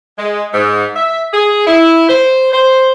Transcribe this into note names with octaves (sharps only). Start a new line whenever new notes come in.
G#3
G#2
E5
G#4
E4
C5
C5